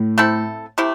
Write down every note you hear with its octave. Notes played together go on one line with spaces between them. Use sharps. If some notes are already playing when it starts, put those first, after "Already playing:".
Already playing: A2
A3 C4 E4 A4
C3 A3 E4 G4